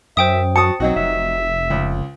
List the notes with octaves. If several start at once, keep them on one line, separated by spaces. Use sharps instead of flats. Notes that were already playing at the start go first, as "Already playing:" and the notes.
F#2 C5 E5 G5 D#6
F#4 A5 D#6 C#7
B1 F#3 C4 D#4 F#4
F1 E5
C#2